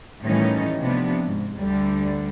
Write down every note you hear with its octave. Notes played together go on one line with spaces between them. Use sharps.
A2 D#3 E3 G3 C#4 D#4
C3 F3 B3 D4
G#2
D2 D3 G3